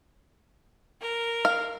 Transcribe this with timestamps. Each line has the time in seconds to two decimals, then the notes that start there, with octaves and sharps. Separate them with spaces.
1.00 A#4
1.45 F5